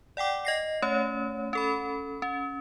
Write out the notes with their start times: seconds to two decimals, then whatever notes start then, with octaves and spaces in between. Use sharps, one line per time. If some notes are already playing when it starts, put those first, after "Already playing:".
0.17 D5 F#5 G5 D6
0.45 D#5 A#6 C7
0.82 A3 C#4 C#5
1.53 C#4 A4 B5
2.22 C#4